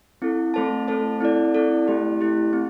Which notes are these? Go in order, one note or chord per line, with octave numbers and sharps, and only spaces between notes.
C4 E4 A4
A3 C4 A4 C5 A5
A3 C4 A4 C5 A5
C4 E4 A4 D5
C4 E4 A4 D5
A3 E4 G4
A3 E4 G4
C4